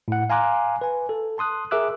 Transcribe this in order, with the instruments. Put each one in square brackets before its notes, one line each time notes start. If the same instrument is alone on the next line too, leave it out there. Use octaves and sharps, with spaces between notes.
[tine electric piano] A2 F#5
F5 G#5 A#5 C6 D6 F#6
B4 G#5
A4
A5 C6 D#6 F#6
G#4 A#4 E5 D6 E6 F#6